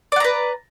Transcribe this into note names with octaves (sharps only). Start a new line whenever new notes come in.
B4 D5 F#5 A#5